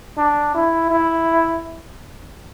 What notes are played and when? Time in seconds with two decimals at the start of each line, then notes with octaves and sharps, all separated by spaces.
0.17 D4
0.54 E4
0.91 E4